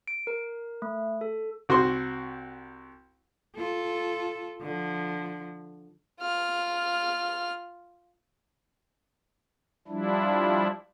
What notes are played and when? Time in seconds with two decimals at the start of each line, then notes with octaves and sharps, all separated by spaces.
0.08 D7
0.27 A#4
0.82 A3
1.21 A4
1.69 C2 F#4 C5 C6
3.56 F4 A4
4.62 D3 F3
6.21 F4 F6
9.88 F3 G3 D4 E4